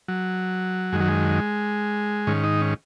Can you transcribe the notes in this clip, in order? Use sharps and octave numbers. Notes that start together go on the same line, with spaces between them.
F#3
F#2 D#3 G#3
F#3
G#3
G#2 D#3 C#4
D#4
C#4